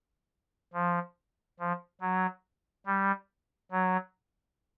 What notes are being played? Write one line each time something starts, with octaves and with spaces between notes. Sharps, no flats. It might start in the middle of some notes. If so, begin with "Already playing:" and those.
F3
F3
F#3
G3
F#3